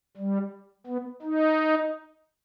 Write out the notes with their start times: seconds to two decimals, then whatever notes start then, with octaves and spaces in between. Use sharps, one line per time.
0.17 G3
0.87 B3
1.22 D#4